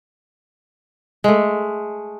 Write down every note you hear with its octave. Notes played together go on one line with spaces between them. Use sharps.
G#3 A3